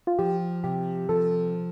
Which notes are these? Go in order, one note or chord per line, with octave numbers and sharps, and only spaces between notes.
F4
F3 G4
C3 G4
F3 A4